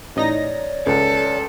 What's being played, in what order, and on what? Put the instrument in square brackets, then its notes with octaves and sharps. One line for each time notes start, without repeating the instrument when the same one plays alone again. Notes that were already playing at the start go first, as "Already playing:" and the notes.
[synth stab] A1 D#4 A#6 [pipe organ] C#5 D5
[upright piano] C#2 [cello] A4